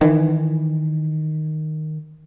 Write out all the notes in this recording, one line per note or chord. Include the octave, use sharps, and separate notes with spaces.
D#3 E3